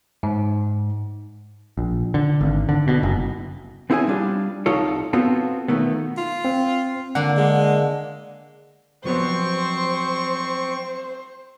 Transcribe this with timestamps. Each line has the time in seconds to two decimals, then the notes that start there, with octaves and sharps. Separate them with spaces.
0.23 G#2
1.77 A#1
2.14 D3
2.41 G#1
2.69 D3
2.88 B2
3.03 F#1
3.90 B3 C4 E4 G#4 F5 G#5
4.07 G3 D4 F4
4.66 C2 D#4 F4 A4 C#5
5.13 B3 C4 F4 F#4 A4
5.68 B2 D#3 A3 B3
6.17 F4
6.45 C4
7.15 D3 A#3 D4 F#5
7.37 G#3
9.05 F3 F#3 B3 C4 C5 C#6